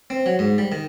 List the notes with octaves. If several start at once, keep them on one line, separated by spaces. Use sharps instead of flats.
C4
F#3
G#2
G3
D#3